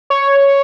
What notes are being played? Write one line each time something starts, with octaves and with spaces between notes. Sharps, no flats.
C#5